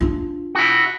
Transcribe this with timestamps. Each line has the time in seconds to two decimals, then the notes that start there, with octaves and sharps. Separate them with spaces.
0.01 D4 F4
0.55 E4 F#4